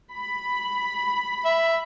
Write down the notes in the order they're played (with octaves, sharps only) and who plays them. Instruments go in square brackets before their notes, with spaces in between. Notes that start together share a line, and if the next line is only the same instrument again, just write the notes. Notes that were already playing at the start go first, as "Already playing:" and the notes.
[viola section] B5
[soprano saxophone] E5